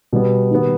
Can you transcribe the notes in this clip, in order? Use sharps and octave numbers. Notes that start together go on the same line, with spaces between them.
B2 G3 B3
D#3 G3 B3